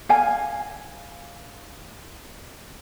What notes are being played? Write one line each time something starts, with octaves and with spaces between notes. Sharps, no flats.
F5 G#5